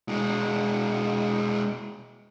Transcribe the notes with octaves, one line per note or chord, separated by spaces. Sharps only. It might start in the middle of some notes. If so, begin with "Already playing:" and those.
B2 G#3